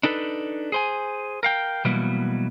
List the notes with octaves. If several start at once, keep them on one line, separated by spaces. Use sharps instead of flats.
D4 D#4 A4 B4
G#4 C5 G#5
A#4 F5 G5
B2 E3 F#3 G3 A#3 B3